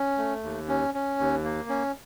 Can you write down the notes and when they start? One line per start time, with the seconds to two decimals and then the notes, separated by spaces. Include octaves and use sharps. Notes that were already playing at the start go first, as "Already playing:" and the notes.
Already playing: C#4
0.18 A3
0.44 D#2
0.68 C#4
0.94 C#4
1.20 D#2
1.44 A#3
1.69 C#4